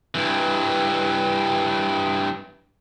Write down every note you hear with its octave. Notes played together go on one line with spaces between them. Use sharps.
G2 E3